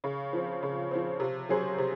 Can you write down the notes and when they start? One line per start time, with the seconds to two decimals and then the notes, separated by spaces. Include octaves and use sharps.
0.04 C#3
0.33 F3 C4
0.63 C#3
0.91 F3 C4
1.20 C3
1.49 F#3 C#4 G#4 C5
1.78 C3